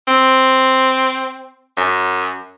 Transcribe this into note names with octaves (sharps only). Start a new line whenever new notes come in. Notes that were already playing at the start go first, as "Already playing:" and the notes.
C4
F#2